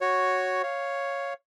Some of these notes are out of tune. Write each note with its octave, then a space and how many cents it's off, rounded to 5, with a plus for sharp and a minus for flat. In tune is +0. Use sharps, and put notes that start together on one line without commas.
F#4 +0 C#5 +0
C#5 +0 F5 +0